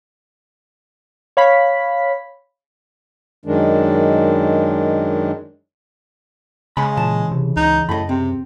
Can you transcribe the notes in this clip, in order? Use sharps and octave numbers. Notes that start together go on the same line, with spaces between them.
C#5 F5 B5 B6
F#2 D#3 G#3 D4
C#3 G#3 B5
A#2 E3 A5
C3
C#2 D#4
F#2 A2 D#5 B5
C3 C4